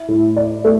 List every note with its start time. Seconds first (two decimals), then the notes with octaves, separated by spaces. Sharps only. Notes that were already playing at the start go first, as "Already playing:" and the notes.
Already playing: E4
0.08 A2
0.36 D5
0.64 A3